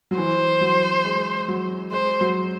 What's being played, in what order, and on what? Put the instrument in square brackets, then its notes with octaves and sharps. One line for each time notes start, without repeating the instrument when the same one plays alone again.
[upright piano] F#3
[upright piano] E3 [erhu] C5
[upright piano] F#3
G#3
F#3
[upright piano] G#3 [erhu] C5
[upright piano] F#3